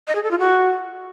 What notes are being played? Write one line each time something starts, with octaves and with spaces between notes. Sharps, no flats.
D#5
G#4
A4
F4
F#4